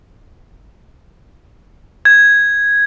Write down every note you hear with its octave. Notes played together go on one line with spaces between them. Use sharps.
G#6